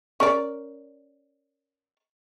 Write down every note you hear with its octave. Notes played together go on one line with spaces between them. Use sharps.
C#4 A#4 D5